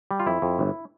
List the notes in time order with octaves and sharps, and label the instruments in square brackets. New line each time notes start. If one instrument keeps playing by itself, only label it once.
[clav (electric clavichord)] G3
F4
F2 E4
F2
G1